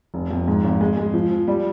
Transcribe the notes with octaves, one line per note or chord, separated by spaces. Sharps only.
F1
F2
G#2
G#1
G#3
G#3
F3
F3
G3